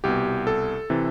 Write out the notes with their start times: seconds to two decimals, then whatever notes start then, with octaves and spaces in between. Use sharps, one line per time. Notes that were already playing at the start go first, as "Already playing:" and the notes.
0.04 C2 B2 G4
0.47 A4
0.90 C3 E3